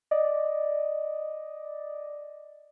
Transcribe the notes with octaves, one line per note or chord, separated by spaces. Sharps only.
D5 D#5